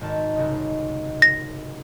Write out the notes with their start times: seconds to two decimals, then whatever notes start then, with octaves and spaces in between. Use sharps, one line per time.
0.01 G#1 D#3 A5
0.36 C2 C#3 D#4
1.22 A#6